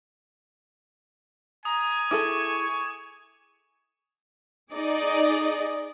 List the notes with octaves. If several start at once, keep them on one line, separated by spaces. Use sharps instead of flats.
G#5 A#5 D#6
E4 G#4 A4 C#6 D6
D#4 G#4 D5 D#5